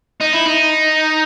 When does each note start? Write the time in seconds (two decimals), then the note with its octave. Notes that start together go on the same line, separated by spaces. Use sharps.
0.21 D#4
0.33 E4
0.46 D#4